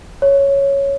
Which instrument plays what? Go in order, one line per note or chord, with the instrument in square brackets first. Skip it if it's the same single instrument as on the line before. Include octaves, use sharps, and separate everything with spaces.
[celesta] C#5